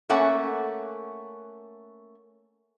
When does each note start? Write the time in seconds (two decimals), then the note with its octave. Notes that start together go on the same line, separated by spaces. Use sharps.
0.09 A3 A#3 C#4 F#5